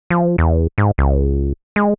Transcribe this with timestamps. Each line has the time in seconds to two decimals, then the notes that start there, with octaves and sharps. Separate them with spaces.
0.10 F3
0.38 E2
0.78 G#2
0.98 C#2
1.76 G#3